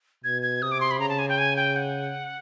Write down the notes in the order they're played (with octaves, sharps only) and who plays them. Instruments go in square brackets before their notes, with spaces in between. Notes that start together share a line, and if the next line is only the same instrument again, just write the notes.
[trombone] B2 [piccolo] G#6
[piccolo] G#6
[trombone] C3 [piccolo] D#6
[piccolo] D6
C6
B5
[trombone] C#3 [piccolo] A#5
[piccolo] A5
G#5
G5
G#5
G5
F#5